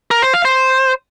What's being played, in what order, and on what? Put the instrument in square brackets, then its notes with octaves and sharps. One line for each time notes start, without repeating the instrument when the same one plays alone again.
[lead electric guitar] A#4
C5
F5
C5